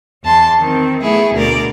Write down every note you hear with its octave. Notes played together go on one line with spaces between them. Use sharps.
E2 A5 C6
D#3 C4
A3 B3 E4 G#4
D2 B2 A#4 D5